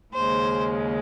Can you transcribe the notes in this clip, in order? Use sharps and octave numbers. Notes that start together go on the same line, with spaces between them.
D#2 C#3 G#3 C5